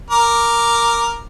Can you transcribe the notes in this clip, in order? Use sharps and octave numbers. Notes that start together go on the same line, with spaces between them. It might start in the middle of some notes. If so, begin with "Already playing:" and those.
A#4 D6